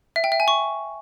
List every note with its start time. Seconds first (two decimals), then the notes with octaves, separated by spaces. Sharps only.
0.16 E5
0.24 G5
0.32 E5
0.40 G#5
0.48 C#6